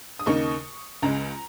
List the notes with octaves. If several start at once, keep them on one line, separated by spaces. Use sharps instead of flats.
D#6
D#2 C#3 A#3 D#4 C#6
C#2 C#3 G#3 A#5